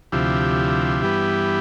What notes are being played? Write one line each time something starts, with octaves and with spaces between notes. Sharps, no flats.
D2 C3 F3 E4 G4
G2 E3 G3 B3